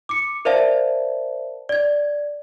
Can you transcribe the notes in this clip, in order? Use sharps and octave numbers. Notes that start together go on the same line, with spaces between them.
D6 C#7
A#4 C5 D5 E5 F5 A5
D5 G#6